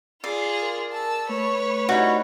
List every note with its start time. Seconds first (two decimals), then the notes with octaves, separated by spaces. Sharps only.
0.24 F4 G#4 D5 C7
0.62 A#4
0.92 A5 E6
1.29 A3 B4 C#5
1.89 G3 D#4 E4 F#4